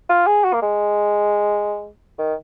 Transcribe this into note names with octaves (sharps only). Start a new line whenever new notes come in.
F4
G#4
F#4
A#3
G#3
D#3